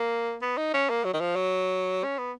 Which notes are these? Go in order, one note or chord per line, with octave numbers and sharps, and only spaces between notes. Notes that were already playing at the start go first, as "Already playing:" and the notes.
Already playing: A#3
B3
D#4
C#4
A#3
F#3
D#3
F3
F#3
C#4
B3